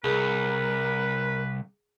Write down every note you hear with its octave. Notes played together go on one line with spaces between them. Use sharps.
C2 G#4 A#4 B4